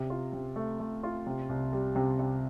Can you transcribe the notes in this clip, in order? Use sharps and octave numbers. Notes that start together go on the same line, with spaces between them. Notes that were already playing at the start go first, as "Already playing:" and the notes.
Already playing: C3
F4
C3
A3
A3
F4
C3
C2
G3
C3
C3